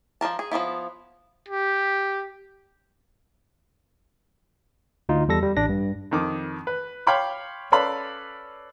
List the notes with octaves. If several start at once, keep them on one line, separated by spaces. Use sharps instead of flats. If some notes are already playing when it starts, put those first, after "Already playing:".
F3 F#3 A#4 A5
G#4
F3 F#3 B3 E4
G4
D2 D#4 F4
E2 G3 A4 A#6
G3
A1 D4 A#6
G2
F2 D#3 D6
B4
C#5 F5 G5 B5 C6 D6
C#4 A4 B4 D5 F5 B5